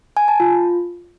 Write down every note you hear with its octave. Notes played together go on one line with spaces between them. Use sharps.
G#5
A5
F4